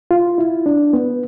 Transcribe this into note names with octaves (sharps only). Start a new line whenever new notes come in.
F4
E4
D4
B3